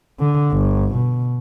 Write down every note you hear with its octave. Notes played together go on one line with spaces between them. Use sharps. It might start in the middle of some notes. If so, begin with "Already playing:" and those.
D3
G1
B2